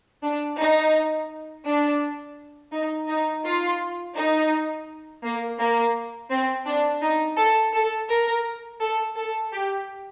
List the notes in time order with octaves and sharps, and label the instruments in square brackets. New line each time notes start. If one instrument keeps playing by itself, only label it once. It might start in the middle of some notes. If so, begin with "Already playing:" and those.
[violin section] D4
D#4
D4
D#4
D#4
F4
D#4
A#3
A#3
C4
D4
D#4
A4
A4
A#4
A4
A4
G4